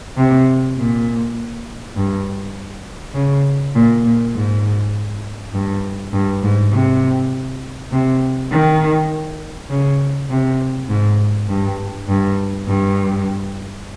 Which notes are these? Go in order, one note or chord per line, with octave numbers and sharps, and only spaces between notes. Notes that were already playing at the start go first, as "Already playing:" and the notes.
C3
A#2
G2
C#3
A#2
A#2
G#2
G2
G2
G#2
C3
C3
D#3
C#3
C3
G#2
G2
G2
G2